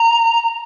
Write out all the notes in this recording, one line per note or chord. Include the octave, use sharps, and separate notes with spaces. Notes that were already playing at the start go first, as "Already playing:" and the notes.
Already playing: A#5